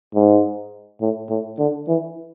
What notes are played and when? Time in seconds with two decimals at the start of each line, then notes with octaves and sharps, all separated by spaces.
0.15 G#2
1.01 A2
1.29 A2
1.59 D3
1.87 E3